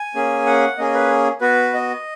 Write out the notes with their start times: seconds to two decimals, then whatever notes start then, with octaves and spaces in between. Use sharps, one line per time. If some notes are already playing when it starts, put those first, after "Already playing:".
Already playing: G#5
0.15 A#3 C#4 G#4
0.46 F#5
0.77 A#3 C#4 G#4 D#5
0.94 B4
1.41 B3 F#4 B4
1.74 D#5